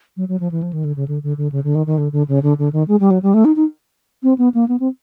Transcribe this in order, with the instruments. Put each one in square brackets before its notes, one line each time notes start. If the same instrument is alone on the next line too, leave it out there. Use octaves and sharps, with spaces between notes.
[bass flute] F#3
F#3
F3
E3
F3
D#3
D3
C#3
D3
D3
D3
C#3
D3
D#3
D#3
D3
D3
C#3
D3
D3
D#3
G#3
G3
F#3
G3
A3
D#4
D#4
C4
B3
A#3
B3
C4